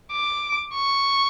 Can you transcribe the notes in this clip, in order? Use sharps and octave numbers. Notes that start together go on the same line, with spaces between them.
D6
C#6